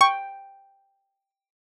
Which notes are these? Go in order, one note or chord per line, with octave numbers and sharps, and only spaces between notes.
G5 C#6